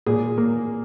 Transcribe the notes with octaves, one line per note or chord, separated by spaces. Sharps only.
A#2 G#4
A#3